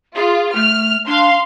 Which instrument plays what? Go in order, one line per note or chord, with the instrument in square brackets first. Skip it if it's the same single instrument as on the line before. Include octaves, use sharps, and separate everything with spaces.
[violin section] F4 [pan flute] G#4
[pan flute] A3 [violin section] F6
[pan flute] D4 [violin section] F5 C6